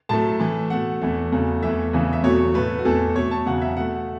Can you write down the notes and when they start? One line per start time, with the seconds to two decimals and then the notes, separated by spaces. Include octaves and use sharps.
0.09 A2 F#3 A3 A5
0.40 A2 E3 A3
0.70 B2 A3 F#5
1.02 E2 E3 A3
1.32 E2 C#3 F#3 A3
1.63 E2 E3 A3 E5
1.93 E2 C#3 E3 A3
2.13 E5
2.23 E2 B2 F#3 A3 C#5
2.54 A2 A3 B4
2.79 F#4
2.85 E2 E3 A3 A4
3.16 B2 A3 C#5
3.31 A5
3.46 E2 C#3 F#3 F#5
3.62 E5
3.77 B2 A3 F#5